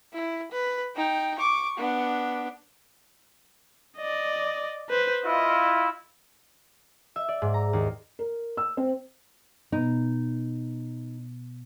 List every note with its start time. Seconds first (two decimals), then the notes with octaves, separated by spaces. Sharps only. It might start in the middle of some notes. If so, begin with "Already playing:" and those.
0.13 E4
0.52 B4
0.96 D#4 G5
1.38 C#6 D6
1.78 B3 D4
3.98 D5 D#5
4.90 B4 C5
5.25 E4 F4 D#5
7.16 E5
7.28 D5
7.42 G#2
7.54 A#5
7.73 D#2
8.19 A#4
8.57 E6
8.77 C4
9.72 B2 B3 D#4